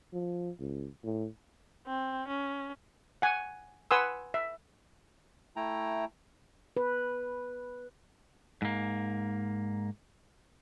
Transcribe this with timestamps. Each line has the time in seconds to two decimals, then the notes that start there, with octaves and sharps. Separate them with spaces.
0.13 F3
0.60 C#2
1.04 A2
1.87 C4
2.28 C#4
3.22 F#5 G#5
3.91 B4 F#5 G#5 C6 D#6 E6
4.34 E5
5.56 A3 E4 G5 A#5
6.77 B4
8.62 G#2 A#3